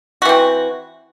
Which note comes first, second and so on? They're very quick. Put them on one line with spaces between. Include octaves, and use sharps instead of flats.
F#4 E3 C4